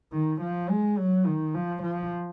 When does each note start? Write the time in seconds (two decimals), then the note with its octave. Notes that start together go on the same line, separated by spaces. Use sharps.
0.13 D#3
0.41 F3
0.69 G#3
0.98 F#3
1.26 D#3
1.54 F3
1.82 F3